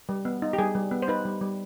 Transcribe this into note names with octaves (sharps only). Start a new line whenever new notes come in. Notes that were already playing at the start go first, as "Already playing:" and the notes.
G3
B3
D#4
G4
G3 G#4
G3
B3
C5
D#4 B4
G3
G3